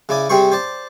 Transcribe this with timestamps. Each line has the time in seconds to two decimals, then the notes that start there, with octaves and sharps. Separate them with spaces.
0.09 C#3 E4 D5 G#5
0.29 C3 G3 C4 G#4 C5 C#6
0.52 C5 D5 A5